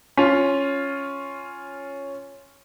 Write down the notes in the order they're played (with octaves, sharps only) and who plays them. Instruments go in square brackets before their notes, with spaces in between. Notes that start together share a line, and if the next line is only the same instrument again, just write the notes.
[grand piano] C#4 F4